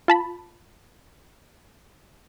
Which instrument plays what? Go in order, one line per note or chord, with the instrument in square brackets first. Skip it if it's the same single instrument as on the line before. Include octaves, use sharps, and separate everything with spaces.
[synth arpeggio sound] F4 A5 B5